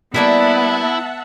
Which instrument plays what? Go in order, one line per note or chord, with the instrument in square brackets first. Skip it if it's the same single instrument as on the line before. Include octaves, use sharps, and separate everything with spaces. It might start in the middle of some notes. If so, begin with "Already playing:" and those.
[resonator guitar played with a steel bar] G3 A#3 D5 [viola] B3 [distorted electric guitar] E4 [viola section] E5 F#5 A5